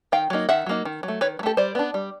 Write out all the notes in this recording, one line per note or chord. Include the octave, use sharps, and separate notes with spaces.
D#3 F5 G5
F#3 A#3 D#4
D#3 E5 F#5
F#3 A#3 D#4
D#3
F#3
A3
D#3 B4 C#5
F#3
A3 G4 A4
G3 C5 D5
B3 D4
G3